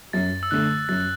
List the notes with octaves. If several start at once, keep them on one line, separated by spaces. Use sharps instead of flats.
F#2 A6
E6
D3 A3 F#6
F#2 A6